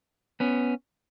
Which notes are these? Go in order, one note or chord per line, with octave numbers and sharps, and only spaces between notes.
B3 C#4